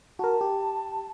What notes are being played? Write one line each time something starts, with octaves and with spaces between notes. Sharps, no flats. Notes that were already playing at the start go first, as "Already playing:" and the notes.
F#4 A#4 A5
G4